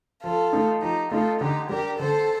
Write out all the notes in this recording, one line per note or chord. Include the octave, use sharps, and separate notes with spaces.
F3 F4 A4
A3 D#4
F3 D#4 G4
A3 D#4 F4 A4
D3 D#4 G4
G3 D4 G4 A#4
D3 A4 C5